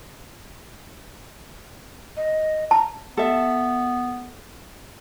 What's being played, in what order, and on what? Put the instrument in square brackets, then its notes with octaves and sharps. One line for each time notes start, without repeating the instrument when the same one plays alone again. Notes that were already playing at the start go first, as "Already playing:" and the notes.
[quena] D#5
[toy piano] A5 [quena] A#5
[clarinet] B3 [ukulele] A4 E5